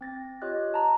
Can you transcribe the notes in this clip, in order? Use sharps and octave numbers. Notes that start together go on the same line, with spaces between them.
C4 A6 A#6
F4 G4 C#5 D#5 F#6
A5 A#5